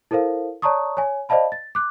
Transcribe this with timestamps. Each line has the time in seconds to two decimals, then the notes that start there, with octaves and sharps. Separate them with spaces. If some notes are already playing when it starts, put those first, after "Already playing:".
0.11 E4 A4 A#4 C5 F5
0.62 C#5 D5 A5 A#5 C#6 D#6
0.97 C#5 G#5
1.29 C5 D5 D#5 F5 A5 B5
1.52 A6
1.75 D6 F#6